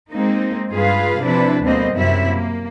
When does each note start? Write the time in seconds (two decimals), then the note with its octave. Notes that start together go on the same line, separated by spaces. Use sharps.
0.11 G#3 A#3 C4 D#4
0.70 G2 F4 G#4 B4 F5
1.23 C3 F3 D4 E4 B4
1.63 D2 B2 G3 A#3 C4 D#5
1.94 F#2 C3 F#3 E4 E5
2.29 A#3